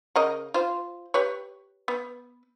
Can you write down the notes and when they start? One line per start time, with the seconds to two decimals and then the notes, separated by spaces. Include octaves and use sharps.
0.16 C#3 A#4 D#5
0.54 F4 C5
1.14 G4 B4 C#5
1.88 B3